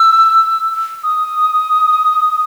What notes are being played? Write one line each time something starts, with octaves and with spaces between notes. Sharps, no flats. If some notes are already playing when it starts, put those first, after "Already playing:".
Already playing: E6
D#6